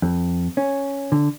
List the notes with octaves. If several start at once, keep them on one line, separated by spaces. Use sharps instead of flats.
F2
C#4
D3